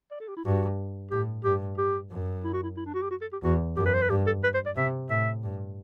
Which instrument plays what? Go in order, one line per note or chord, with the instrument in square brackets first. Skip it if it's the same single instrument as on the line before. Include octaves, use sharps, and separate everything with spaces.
[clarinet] D5
A4
G4
E4
[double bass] G2 [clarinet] F#4
[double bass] A2 [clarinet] G4
[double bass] G2 [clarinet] G4
[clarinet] G4
[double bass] F#2
[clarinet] E4
F#4
E4
E4
D4
F#4
G4
F#4
A4
G4
[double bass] E2 [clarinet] F#4
[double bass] F#2 [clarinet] G4
[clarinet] B4
C5
B4
[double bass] G2 [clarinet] G4
[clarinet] A4
B4
C5
D5
[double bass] C3 [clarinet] E5
[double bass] A2 [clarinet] E5
[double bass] G2